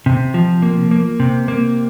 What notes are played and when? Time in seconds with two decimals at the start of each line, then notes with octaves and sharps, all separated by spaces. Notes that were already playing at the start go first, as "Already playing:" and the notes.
0.06 C3
0.34 F3
0.62 A#3
0.91 A#3
1.20 C3
1.48 A#3